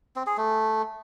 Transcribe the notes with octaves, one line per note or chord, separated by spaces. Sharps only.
C4
G#4
A3